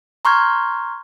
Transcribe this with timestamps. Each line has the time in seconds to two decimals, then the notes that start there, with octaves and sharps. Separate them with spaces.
0.25 A#5 C6 C#6 F6 G6 G#6